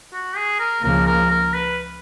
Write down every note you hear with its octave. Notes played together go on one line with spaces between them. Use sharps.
F#4
G#4
A#4
C#2 C#3 F3 A#3 A#4
A#4
A#4
B4